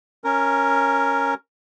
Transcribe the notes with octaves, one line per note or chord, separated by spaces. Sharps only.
C#4 A#4